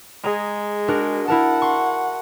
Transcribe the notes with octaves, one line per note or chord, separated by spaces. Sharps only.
G#3 G#4 A#5
D4 F#4 A#4
E4 A#4 F#5 A5
C6 C#6